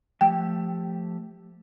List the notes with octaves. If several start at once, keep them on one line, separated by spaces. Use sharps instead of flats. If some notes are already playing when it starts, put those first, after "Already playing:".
F3 A3 G4 G5